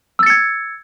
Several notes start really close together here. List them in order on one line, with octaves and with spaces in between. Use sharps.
E6 A6 C#7 G#6